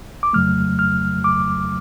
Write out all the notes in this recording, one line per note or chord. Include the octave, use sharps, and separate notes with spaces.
D6
F2 C#3 F#3 A3 F6
F6
D6